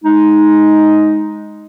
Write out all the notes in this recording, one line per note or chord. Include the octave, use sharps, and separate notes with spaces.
G#3 D#4